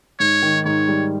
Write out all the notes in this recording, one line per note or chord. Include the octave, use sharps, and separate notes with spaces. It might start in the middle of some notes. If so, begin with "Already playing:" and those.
G#2 C#5
D#3
G#2 C#5
G3